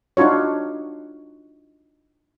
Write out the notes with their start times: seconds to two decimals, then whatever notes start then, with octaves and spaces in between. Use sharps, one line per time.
0.17 D4 D#4 F4 F#4 C#5